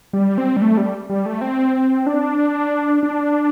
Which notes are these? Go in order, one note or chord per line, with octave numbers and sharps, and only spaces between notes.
G3
C4
G3
A3
G3
G3
A3
C4
D4
D4